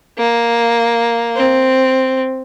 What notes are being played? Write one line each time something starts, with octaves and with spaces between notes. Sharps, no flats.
A#3
C4